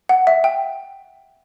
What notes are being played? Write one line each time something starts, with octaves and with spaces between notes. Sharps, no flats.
F#5
E5
G5